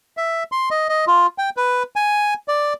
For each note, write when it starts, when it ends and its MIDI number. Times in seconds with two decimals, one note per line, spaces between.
0.17 0.43 76
0.52 0.69 84
0.71 0.87 75
0.89 1.05 75
1.07 1.27 65
1.38 1.50 79
1.57 1.83 71
1.96 2.34 80
2.48 2.73 74